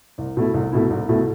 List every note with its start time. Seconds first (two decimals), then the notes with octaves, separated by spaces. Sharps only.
0.18 C2
0.37 B2 A3 E4
0.54 C2
0.72 B2 A3 E4
0.90 C2
1.09 B2 A3 E4